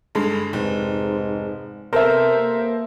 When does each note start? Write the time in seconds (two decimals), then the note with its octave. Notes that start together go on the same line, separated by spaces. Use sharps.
0.15 G2 D3 G#3
0.53 F1 G#2
1.93 C3 B3 A4 A#4 C5 E5
2.38 A#3